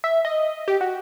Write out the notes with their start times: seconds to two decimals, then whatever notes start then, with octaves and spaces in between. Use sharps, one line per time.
0.04 E5
0.25 D#5
0.68 G4
0.81 F#4